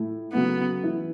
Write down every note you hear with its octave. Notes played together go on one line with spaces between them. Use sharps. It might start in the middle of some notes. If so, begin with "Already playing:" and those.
Already playing: A2 A3 E4
C#3 F#3 A3 B3 E4
E3 B3 E4